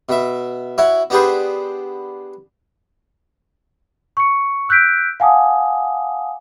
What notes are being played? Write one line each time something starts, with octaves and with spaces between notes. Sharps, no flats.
B2 E5
E4 F#4 C#5
B3 D4 G4 G#4 B4 C5
C#6 C#7
E6 F#6 G6 B6 D7
F5 F#5 G#5 A5 D6 D#6